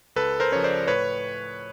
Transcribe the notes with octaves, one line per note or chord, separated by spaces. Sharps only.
C#2 A4 B4
A#4 C5
C#3 F3 C#5
C5 D5
A2 B4 C#5